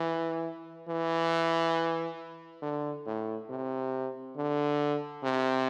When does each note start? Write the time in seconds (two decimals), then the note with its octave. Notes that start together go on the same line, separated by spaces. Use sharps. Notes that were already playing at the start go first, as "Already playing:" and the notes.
Already playing: E3
0.88 E3
2.62 D3
3.06 A2
3.50 C3
4.37 D3
5.23 C3